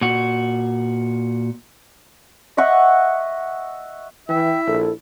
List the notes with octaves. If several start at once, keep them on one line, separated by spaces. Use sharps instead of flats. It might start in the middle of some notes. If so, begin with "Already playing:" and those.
A#2 F#4
D#5 E5 F#5 C#6
E3 E4 E5 G5
A#1 A4